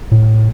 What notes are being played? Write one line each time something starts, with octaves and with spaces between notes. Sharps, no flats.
A2